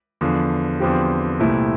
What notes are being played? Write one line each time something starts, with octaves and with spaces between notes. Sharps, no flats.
E2 D3 F3
E2 D3 F3 C4 G4
C2 A#2 A3 C4 E4